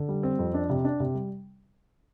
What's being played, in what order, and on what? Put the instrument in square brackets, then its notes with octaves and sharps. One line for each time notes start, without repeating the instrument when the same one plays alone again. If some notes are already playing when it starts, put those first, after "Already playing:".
Already playing: [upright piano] D3
G3
C4
F2
D4
C3
D4
C3
G3